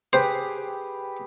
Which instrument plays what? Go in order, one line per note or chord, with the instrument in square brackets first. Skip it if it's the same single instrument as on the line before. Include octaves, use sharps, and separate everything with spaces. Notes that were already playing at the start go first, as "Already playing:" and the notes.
[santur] G4 G#4 B4 [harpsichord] C5